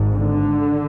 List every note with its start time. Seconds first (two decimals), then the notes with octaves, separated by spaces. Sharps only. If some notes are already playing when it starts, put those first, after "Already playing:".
Already playing: G#1 G#2
0.15 D3